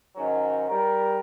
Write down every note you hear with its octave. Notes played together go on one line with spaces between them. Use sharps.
G#2 D#3 F#3 C#4
G3 A#4